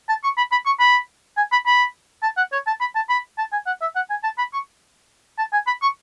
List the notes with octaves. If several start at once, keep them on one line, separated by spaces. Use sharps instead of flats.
A5
C#6
B5
B5
C#6
B5
G#5
B5
B5
A5
F#5
C#5
A5
B5
A5
B5
A5
G#5
F#5
E5
F#5
G#5
A5
B5
C#6
A5
G#5
B5
C#6